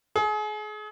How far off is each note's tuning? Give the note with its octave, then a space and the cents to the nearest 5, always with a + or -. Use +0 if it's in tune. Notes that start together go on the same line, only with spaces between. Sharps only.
G#4 +35